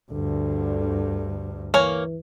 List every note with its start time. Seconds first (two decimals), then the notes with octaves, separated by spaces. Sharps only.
0.11 D2 G2 D3
1.74 E3 A#3 C#5 G#5